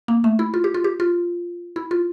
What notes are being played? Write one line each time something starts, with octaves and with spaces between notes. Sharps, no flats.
A#3
A3
E4
F4
G4
F4
G4
F4
E4
F4